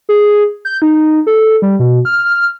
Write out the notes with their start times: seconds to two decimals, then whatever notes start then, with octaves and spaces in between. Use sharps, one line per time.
0.09 G#4
0.65 G6
0.82 D#4
1.27 A4
1.62 G3
1.79 B2
2.05 F6